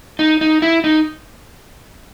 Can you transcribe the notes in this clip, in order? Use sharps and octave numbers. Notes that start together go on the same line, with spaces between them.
D#4
D#4
E4
D#4